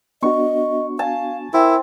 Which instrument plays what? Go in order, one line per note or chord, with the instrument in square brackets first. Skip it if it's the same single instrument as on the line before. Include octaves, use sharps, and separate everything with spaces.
[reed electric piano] B3 D4 F#4 [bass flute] D#5 [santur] C#6
[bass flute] F5 [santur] G#5 A5
[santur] C4 [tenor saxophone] E4 [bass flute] A#4